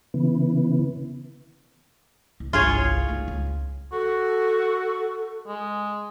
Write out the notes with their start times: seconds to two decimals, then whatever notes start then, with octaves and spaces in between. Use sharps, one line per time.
0.14 C#3 E3 B3
2.40 C2
2.53 G1 C2 F4 G#4 C#5
3.09 A#3 D#4
3.28 C#2
3.93 F#4 A4
5.48 G#3